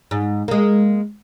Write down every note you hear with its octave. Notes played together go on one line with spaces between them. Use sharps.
G#2
G#3 A#3